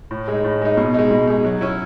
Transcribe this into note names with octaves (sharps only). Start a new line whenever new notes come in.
A2
G#3 D#4
A2
G#3 D#4
B2
G#3 D#4
B2
G#3 D#4
F#3
C#4 E4